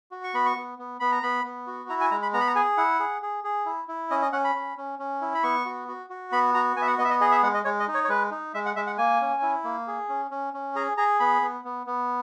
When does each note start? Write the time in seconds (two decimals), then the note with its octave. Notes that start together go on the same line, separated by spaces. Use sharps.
0.11 F#4
0.24 C#6
0.34 B3 B5
0.46 C#6
0.57 B3
0.78 B3
1.00 B3 B5
1.12 A#5
1.23 B3 B5
1.44 B3
1.67 F#4
1.89 E4 A#5
2.01 G#5
2.11 G#3 A#5
2.22 B5
2.33 B3 A#5
2.41 B5
2.47 A#5
2.55 G#4 G#5
2.77 E4 F#5
3.00 G#4
3.22 G#4
3.44 G#4
3.66 E4
3.88 E4
4.11 C#4 D#5
4.22 D#5
4.32 C#4 F#5
4.44 B5
4.55 C#4
4.77 C#4
4.99 C#4
5.21 E4
5.34 B5
5.43 B3 C#6
5.65 F#4
5.88 F#4
6.10 F#4
6.32 B3 B5
6.54 F#4 A#5
6.76 B3 G#5
6.82 E5
6.87 F#5
6.98 B3 D#5
7.04 E5
7.10 D#5
7.21 G#4 D#5
7.31 E5
7.43 G#3 F#5
7.54 D#5
7.65 G#3 C#5
7.80 D#5
7.88 D#4
7.94 C#5
8.05 C#5
8.09 G#3 B4
8.31 D#4
8.54 G#3 E5
8.66 F#5
8.76 G#3 E5
8.87 F#5
8.98 A#3 G#5
9.21 C#4
9.42 E4
9.64 A#3
9.87 G#4
10.09 C#4
10.31 C#4
10.54 C#4
10.75 G#4 A#5
10.97 G#4 A#5
11.20 B3 B5
11.42 B3
11.65 B3
11.87 B3